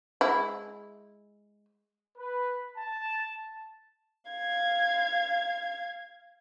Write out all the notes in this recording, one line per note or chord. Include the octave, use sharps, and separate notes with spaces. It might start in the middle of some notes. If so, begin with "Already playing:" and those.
G#3 E4
B4
A5
F5 G#6